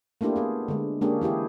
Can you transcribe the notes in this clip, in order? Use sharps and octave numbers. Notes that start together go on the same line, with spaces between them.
A3 A#3 D4 E4 F4 G4
B3 G#4
D3 G#3
G#3 A#3 C#4 D4 G4 G#4
E3 E4 G4 G#4